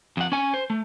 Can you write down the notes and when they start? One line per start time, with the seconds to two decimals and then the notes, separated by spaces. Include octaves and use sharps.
0.17 F2 F#5
0.32 C#4 G#5
0.54 C5
0.70 A3